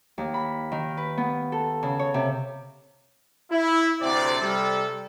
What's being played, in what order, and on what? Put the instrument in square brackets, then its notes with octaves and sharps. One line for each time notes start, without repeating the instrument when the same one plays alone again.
[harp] D#2
B5
D#3
B4
B3
A4
C#3
C#5
C3
[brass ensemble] E4
D2 C3 C4 D5
C3 G3 A4